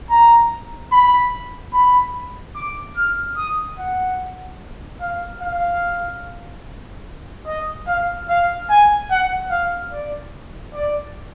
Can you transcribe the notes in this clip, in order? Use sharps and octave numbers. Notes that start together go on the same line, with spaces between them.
A#5
B5
B5
D6
F6
D#6
F#5
F5
F5
D#5
F5
F5
G#5
F#5
F5
D5
D5